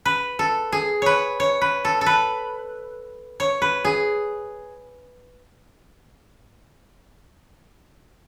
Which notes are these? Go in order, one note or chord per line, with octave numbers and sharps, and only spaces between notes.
B4
A4
G#4
B4 C#5
C#5
B4
A4
A4
B4
C#5
B4
G#4